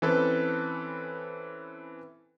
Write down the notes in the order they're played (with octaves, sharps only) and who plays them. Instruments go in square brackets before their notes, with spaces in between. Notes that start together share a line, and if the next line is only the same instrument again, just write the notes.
[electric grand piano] E3 C4 C#4 A4 B4